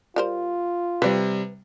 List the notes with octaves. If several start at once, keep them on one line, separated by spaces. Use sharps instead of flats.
G3 F4 A#4 C5
C3 G3 B4 D5